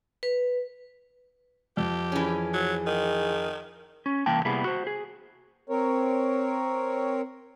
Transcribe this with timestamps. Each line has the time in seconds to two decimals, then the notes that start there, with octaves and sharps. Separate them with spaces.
0.23 B4
1.77 F2 G4
2.12 E3 C#4 G#4
2.54 F#3
2.87 D#3
4.06 C#4
4.26 C2 E3 A#3 G5 A5
4.45 C3 G3 A#3 B3 E4 G#4
4.65 F#4 C5
4.87 G#4
5.69 C4 A#4 C#5